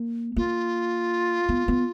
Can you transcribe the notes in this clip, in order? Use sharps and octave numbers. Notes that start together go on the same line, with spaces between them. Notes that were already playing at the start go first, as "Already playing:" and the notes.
Already playing: A#3
A#3 F4
B3
B3